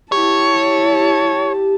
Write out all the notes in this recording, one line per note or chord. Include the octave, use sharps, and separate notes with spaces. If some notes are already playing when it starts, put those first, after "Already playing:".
E4 G4 C#5 A5